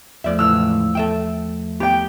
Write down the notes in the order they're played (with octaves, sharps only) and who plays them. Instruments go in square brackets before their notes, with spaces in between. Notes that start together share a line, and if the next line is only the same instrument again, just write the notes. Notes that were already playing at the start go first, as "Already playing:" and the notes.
[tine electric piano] E2 F3 A3 [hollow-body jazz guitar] D5 E5
[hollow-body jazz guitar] C#2 A2 E3 [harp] E6 F6
[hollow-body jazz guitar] A4 E5 G5
[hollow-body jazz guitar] B3 [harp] G4 G5